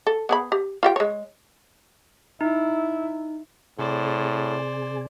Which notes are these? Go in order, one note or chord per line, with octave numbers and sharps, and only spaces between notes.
A4
B3 G#4 B5
G4
F4 G4 G5
G#3 C#5
D#4 E4
A2 C3 G#4 C5 D5